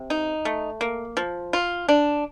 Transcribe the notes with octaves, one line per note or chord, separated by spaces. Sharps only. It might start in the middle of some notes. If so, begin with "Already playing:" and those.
Already playing: C3
D#4
A3
A#3
F3
F4
D4